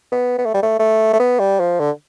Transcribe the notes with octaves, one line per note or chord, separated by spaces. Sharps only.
B3
B3
A3
G3
A3
A3
A3
B3
G3
F3
D3